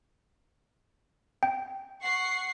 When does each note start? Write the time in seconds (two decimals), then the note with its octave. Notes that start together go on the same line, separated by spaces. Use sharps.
1.43 G5
2.03 F#5 C#6 C7